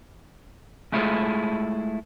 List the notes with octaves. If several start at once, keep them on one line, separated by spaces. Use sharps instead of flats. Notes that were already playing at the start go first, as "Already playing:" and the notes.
G#3 A3 E4 F4 G#4 A4